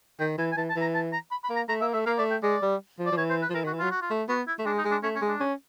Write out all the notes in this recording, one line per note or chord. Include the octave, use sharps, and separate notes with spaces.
D#3 G5
E3 G#5
G#5
E3 A5
A5
E3
A#5
A5
A#5
B5
B5
A#3
A#5
A3 A#5
A#3 E5
A3 E5
A#3 F5
A3 D5
G5
G#3 D5
G3
F3
D5
F3
E3 C#5
C5
B4
F3
E3 A#4
D#3
F#4
E3
F#3 F4
F#4
F4
A3
B3 F#4
E4
A3
G#3 D4
D#4
G#3
D4
A3 C#4
C#4
G#3
D4
C#4